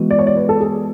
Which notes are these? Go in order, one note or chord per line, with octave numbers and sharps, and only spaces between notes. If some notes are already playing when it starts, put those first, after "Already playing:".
Already playing: E3 G#3 B3 F#4
D5
C#5
D5
B4
A4
G#4